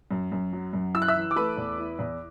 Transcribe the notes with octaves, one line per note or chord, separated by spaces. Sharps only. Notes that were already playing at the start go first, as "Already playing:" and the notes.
F#2
F#2
F#3
F#2
E4 E6
F#6
E5 E6
E3
D6
A3 B4 B5
E2
E4
E2